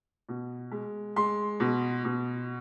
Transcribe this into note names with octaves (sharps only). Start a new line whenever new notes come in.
B2
G#3
G#3 C6
B2
B2